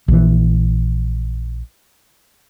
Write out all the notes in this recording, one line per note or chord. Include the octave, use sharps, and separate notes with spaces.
A#1 E3